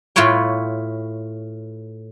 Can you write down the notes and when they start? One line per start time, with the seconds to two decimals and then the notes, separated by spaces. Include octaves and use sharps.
0.16 A2 F4 B4 C#5 G5